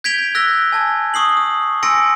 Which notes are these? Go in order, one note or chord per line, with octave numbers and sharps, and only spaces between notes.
G6 G#6 B6 D7 F7 G7
E6 F#6 A#6 B6 G7
G#5 A5 G#6
C#6 D#6 C7 F#7
D#6
G#5 C6 E6 A#6 C#7 D7